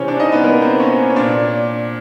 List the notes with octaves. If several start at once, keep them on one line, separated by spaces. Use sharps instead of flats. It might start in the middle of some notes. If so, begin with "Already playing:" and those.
Already playing: C3 E3 C4 C#4 C5 C#5
D4 D5
D#4 D#5
B3 B4
A#3 A#4
C4 C5
C#4 C#5
C#5
A#2 D4 D5